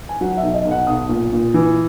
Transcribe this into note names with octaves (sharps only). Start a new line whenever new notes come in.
G#5
F#3 F#5
F#5
E5
B1
D#5
B1
F#5
B1 D#6
A#2
A#2
E3